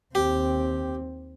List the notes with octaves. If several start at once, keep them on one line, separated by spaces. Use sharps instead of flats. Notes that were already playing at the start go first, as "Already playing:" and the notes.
D#2 C4 G4